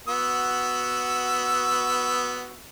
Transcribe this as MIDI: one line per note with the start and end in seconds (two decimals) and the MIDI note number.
0.08 2.58 59
0.08 2.58 66
0.08 2.58 88